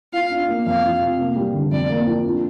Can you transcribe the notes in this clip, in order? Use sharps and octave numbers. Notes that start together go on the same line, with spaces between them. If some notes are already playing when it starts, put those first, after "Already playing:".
F4 F5
D4
A#3
F2 F5
F3
C3
A#3
G3
D3
F2 D5
A#3
F3
D4